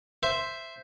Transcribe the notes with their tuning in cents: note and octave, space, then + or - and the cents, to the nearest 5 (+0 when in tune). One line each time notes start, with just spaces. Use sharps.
C5 +0 E5 +5